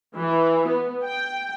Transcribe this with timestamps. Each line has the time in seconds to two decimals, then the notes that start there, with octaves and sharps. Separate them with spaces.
0.15 E3
0.67 B3
1.04 G5